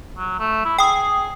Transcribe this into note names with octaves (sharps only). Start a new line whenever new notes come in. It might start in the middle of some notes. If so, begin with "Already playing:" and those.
F#3
A3
E4
G#4 G5 D#6